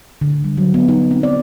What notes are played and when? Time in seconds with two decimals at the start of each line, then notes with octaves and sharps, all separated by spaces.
0.21 D3
0.44 G3
0.57 F#3
0.74 B3
0.89 D#4
1.11 C4
1.23 D5